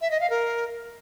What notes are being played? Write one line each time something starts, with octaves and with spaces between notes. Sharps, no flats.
E5
D#5
F5
A#4